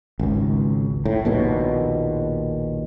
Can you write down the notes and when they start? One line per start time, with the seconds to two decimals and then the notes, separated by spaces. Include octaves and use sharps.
0.19 G#1 C#2
1.05 A2
1.25 A#1 D#2 B2